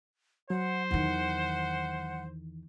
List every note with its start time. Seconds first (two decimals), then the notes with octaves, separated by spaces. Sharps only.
0.50 F#3 C5 F#5
0.91 E2 D#3 F#5